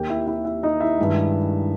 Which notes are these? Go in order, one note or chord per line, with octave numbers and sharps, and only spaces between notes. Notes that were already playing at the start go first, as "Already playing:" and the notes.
Already playing: D#2 D#3 A#3 G4 G5
E4 E5
E4 E5
E4 E5
D#4 D#5
E4 E5
G2 D#3 G#3